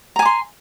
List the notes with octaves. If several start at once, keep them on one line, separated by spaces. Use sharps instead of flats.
G#5 A#5 C6 D6